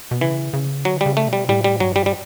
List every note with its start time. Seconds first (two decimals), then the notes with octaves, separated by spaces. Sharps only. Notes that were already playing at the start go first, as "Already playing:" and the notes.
0.11 B2
0.21 C#3 E3
0.53 C#3
0.85 D3 F#3
1.01 C#3 G3
1.17 A3
1.27 B2
1.33 G3
1.49 A2 G3
1.64 G3
1.80 G2 F#3
1.96 G3
2.06 G3